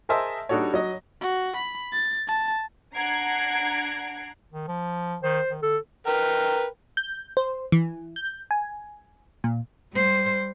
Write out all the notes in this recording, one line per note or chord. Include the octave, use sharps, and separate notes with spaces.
G#4 A#4 C5 D#5 E5 A5
G3 D4 D#4 F#4 A4 C#5
F#3 D#5
F#4
B5
A6
A5
D4 F#5 A#5 G#6 C7 D7
D#3
F3
D#3 C5
D#3
D3 A4
A#4 B4 G5
G6
C5
E3
G6
G#5
A#2
G3 C5